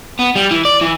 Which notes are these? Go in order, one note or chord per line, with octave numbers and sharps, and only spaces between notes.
B3
G3
E3
D5
E3